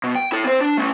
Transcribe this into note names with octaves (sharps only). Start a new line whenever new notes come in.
B2
G5
E4 A4
C4 C5
D4
A3 C#4